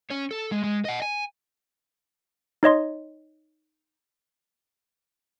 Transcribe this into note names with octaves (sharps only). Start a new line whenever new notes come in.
C#4 C#5
A4
G#3
G#3
D#5 F#5
G#5
D#4 C#5 D#5 C6